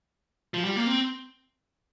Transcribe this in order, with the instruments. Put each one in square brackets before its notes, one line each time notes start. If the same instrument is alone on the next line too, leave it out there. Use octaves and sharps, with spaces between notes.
[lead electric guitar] F3
G3
A#3
C4